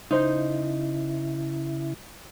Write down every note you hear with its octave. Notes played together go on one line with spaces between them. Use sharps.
C#3 D#4 E4 C5